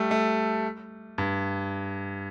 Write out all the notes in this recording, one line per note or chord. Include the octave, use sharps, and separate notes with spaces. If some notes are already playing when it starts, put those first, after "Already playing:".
Already playing: G3 A3
A3
G2